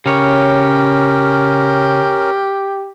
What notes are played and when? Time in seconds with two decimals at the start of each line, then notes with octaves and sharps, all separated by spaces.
0.06 C#3 C#4 G4 A#4 C#5